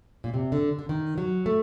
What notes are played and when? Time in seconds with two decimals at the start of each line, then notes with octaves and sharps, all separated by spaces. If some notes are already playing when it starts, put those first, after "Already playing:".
0.24 A#2
0.34 C3
0.52 D3
0.79 D3
0.89 D#3
1.18 F#3
1.46 A3